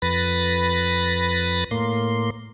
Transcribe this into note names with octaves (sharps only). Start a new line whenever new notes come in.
F2 B4 B5 A6 A#6
A2 A#3 C6